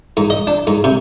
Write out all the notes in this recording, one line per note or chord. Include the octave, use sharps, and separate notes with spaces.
G#2
D#5
D4
G#2
C3